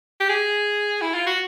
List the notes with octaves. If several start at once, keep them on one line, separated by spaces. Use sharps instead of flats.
G4
G#4
E4
F4
F#4